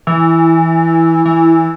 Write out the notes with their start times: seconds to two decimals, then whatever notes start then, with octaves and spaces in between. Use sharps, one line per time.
0.07 E3
1.25 E3